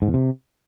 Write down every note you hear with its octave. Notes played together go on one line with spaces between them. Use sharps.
G#2
E2
C3